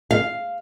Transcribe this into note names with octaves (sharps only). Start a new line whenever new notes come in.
F5